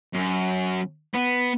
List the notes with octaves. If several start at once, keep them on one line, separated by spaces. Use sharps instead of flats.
F#2
B3